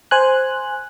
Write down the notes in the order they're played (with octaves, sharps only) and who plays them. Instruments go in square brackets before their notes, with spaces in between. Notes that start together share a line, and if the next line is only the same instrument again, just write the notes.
[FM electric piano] C5 G#5 F#6